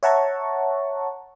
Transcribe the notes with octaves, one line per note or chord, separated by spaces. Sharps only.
C#5 E5 F#5 A5 A#5 C#6